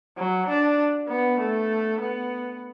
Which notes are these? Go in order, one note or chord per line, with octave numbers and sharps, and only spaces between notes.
F#3
D4
B3
A3
B3